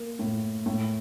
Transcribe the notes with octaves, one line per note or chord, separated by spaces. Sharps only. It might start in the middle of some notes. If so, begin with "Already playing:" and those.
Already playing: A#3
A2
A2